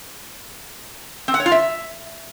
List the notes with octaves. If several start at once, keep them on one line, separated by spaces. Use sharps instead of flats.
C4
F#5
C#5
F4
E5